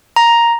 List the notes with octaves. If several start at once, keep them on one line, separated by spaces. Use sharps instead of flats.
A#5